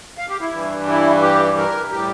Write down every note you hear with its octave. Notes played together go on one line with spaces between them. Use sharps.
F5
G4
E4
G2 E3 G3
E4
G4
A#4
A2 G3 G4